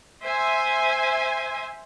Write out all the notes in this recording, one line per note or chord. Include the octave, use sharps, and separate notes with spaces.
C5 E5 G#5